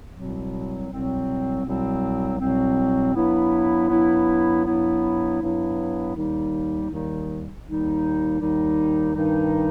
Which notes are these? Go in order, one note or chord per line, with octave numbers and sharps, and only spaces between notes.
C2 B2 F#3 C4
C2 B2 F#3 C4
C2 B2 F#3 C4
C2 B2 F#3 C4
G2 F#3 B3 E4
G2 F#3 B3 E4
G2 F#3 B3 E4
G2 F#3 B3 E4
D#2 D#3 G3 D#4
D#2 D#3 G3 D#4
D#2 D#3 G3 D#4
D#2 D#3 G3 D#4
G2 D#3 G3 D#4